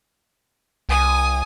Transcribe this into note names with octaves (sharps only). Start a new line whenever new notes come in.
C2 G#5 D#6